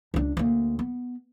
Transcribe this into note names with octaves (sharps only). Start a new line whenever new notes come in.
C#2 D4
D2 A#3
B3